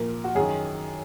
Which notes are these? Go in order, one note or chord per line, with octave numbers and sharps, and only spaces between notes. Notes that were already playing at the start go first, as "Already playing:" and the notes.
Already playing: A#2 F3 A#4
F#4
F#2 D#3 G#4